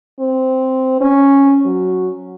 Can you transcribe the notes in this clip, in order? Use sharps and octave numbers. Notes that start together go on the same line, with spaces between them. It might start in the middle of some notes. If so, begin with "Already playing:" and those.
C4
C#4
F#3